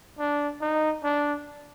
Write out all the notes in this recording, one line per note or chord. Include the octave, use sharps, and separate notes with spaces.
D4
D#4
D4